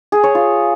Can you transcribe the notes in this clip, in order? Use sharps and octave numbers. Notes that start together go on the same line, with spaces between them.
G#4
C#5
F4